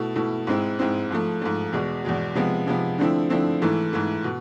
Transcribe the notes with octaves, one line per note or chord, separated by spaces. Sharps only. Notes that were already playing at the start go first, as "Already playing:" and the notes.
Already playing: B2 A3 E4
B2 A3 E4
G#2 G#3 C4 E4
G#2 G#3 C4 E4
G#2 F3 A3
G#2 F3 A3
E2 B2 G#3
E2 B2 G#3
C3 F3 G#3 B3
C3 F3 G#3 B3
D3 F3 A3 C4 E4
D3 F3 A3 C4 E4
G#2 E3 A3 E4
G#2 E3 A3 E4
B2